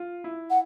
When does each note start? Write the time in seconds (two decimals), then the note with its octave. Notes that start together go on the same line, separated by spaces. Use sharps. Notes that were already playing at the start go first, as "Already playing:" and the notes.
Already playing: F4
0.24 E4
0.50 F#5